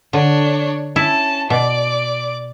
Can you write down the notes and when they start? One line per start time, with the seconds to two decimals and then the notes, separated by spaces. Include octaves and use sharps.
0.13 D3 D4 C#5
0.96 C#4 E4 A5
1.50 B2 D5 D6